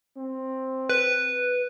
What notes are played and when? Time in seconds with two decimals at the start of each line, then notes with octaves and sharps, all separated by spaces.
0.17 C4
0.90 B4